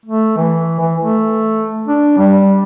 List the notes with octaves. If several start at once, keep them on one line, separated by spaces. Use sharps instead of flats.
A3
E3
E3
A3
D4
G3